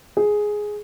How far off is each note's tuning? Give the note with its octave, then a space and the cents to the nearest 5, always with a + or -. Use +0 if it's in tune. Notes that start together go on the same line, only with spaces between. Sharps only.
G#4 +5